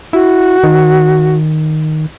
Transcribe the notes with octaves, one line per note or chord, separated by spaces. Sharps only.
E4 F#4
D#3